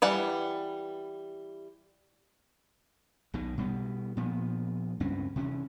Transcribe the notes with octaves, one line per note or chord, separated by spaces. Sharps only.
E3 G3 F#5
B1 B2 D#3
B2 G3 G#3 B3
A#2 F3 B3
C#2 G2 C4 C#4
C3 E3 C4 C#4